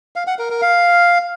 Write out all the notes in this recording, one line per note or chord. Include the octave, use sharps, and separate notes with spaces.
F5
F#5
A#4
A#4
F5